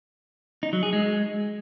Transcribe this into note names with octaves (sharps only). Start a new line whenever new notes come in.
D#4
F#3
G#4
G#3